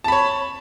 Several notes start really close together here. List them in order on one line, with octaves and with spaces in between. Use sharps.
A5 B5 C#5